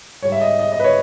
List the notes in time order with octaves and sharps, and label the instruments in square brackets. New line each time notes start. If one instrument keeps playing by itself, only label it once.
[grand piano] G#2 G3 C#5
E5
D#5
D#5
D#5
B4
C#5